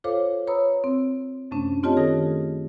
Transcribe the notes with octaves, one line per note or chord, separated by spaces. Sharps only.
F4 A4 C5 C#5 F5 D6
B4 C#5 A#5 B5 D#6 E6
C4
F#2 C3 A3 C#4 D4
C4 F4 G4 C#5 D#5 A5
D#3 A3 G#4 A4 D#6 A#6